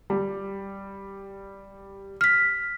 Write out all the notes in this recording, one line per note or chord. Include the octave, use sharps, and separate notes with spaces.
G3
F6 B6